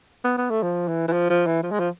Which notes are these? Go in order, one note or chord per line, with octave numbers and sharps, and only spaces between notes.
B3
B3
A3
F3
E3
E3
F3
F3
E3
F3
G#3
F3